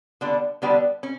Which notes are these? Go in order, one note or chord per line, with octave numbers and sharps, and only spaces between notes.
D3 G3 B3 D4 G4
D3 G3 B3 D4 G4
C#4